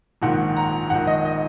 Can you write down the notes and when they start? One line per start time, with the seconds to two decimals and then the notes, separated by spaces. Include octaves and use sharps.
0.22 A#1 G#2 D#3 F#5
0.57 A#5
0.90 A#1 G#2 D#3 F#5
1.07 D#5
1.25 D#5